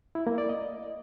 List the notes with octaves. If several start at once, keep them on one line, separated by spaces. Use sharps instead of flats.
E4
A#3
D5
D#5